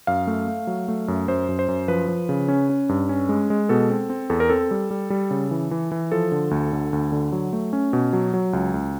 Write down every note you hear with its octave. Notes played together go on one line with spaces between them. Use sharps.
F#2 F5
A3
A3
F#3
A3
F#2
F#2 C5
F#2
C5
F#2
F3 B4
F3
C#3
C#4
C#4
G2
C#4
G#3
G#3
B2 A4
C4
C4
E2 A4
A#4
C4 A4
G3
G3
G3
C#3
E3
E3
E3
F3 A4
D3
D2
D3
D2
D3
F#3
A3
C#4
B2
F#3
F#3
C#2
C#2